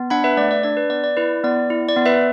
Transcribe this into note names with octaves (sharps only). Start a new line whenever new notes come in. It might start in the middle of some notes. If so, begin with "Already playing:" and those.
Already playing: B3
D4 F#5 B5
B4 E5
A3 D5
D5
D4 D5
B4
B3 D5
D5
E4 B4
B3 D5
E4
D5
B3
B4 E5